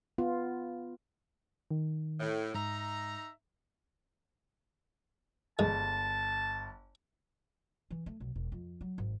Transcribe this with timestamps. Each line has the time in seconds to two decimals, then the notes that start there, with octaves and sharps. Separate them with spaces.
0.18 B3 F4
1.71 D#3
2.19 A2
2.54 G#2 D#4 E5 A#5
5.59 G1 G#3 A5
7.90 E3
8.06 A3
8.20 B1
8.36 E1
8.52 F2
8.81 F#3
8.98 G#1